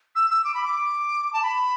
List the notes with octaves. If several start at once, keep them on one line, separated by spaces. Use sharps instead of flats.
E6
E6
D6
B5
D6
A5
B5